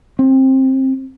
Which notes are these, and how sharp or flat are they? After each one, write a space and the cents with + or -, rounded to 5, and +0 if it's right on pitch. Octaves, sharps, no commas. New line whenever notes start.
C4 +20